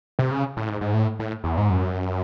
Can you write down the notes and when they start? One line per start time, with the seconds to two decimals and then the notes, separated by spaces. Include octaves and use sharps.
0.19 C3
0.31 C#3
0.57 A2
0.69 G#2
0.81 G#2
0.94 A2
1.19 A2
1.44 E2
1.57 G#2
1.70 F#2